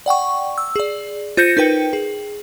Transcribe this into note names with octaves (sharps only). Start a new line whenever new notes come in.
D5 F#5 G5 C#6
E6
G#4 D5
F4 C5 G6 A#6 C#7 D#7
D#4 A#4 B4 G5
G#4